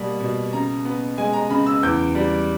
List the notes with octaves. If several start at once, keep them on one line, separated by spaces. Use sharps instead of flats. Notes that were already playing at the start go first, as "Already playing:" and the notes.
Already playing: B2 G3 A#3
B2
C#3 A#5
B3
G#3 G#5
A#5
C#3 B5
E6
E2 G6
G3